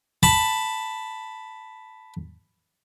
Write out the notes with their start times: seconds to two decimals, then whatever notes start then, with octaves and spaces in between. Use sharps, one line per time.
0.23 A5 B5